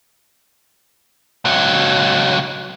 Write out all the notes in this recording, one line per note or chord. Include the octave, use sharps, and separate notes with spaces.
C#2 F#3